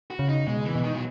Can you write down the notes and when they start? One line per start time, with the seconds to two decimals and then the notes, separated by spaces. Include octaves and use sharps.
0.10 F#4
0.19 C#3
0.29 D#4
0.47 B2 G#3
0.65 E3
0.75 B2
0.84 D#3
0.94 F#3